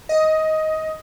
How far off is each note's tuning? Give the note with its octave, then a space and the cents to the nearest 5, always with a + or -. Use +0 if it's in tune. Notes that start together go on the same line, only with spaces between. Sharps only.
D#5 +15